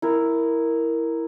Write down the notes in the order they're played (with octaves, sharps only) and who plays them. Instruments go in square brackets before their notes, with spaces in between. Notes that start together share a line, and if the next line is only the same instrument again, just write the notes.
[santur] E4 A#4